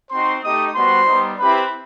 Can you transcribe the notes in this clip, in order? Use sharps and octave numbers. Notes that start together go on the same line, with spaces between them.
C4 D#4 F#4 C5 C6
A3 D#4 G4 D#5 D#6
G3 B3 F#4 C5 C6
G3 B3 D#4
C4 E4 G4 B4 B5